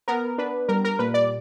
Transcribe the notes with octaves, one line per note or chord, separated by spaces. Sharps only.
B3 A#4
D4 B4
G3 A#4
A#4
A#2 B4
D5